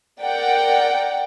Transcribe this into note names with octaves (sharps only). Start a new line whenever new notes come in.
A#4 D5 F#5 G5